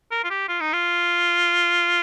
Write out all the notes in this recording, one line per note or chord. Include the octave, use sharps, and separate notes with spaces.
A#4
F4
G4
F4
D#4
F4